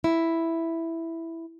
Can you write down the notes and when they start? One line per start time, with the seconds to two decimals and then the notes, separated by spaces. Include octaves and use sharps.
0.04 E4